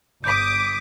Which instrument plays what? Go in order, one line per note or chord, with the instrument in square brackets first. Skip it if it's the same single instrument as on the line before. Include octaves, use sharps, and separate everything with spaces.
[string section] G1 D6 D#6 [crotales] G6 B6